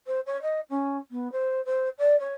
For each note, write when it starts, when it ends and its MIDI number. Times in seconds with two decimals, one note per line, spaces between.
0.07 0.20 72
0.26 0.40 73
0.42 0.60 75
0.70 0.97 61
1.11 1.31 59
1.32 1.64 72
1.65 1.89 72
1.98 2.18 74
2.20 2.34 73